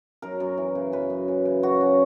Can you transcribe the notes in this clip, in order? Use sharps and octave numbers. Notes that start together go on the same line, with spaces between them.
F#2 A#4
F#2
E3
C#3
F#2 B4
F#2
E3
C#3
F#2 F#4
C#4